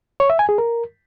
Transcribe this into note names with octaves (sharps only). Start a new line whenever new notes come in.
C#5
E5
G#5
G#4
A#4